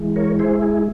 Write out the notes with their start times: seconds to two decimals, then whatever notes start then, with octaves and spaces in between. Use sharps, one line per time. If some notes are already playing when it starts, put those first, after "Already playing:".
Already playing: E3 G#3
0.16 A#4 C#5
0.39 E4 G#4 C5
0.62 G#4